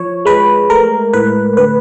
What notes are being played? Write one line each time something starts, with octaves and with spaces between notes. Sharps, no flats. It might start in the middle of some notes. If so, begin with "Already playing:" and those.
Already playing: F3 C#5
G#3 B4
A3 A#4
A2 B4
D3 B4